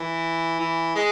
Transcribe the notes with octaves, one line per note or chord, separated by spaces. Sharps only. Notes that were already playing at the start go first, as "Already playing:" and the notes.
Already playing: E3
E3
G#3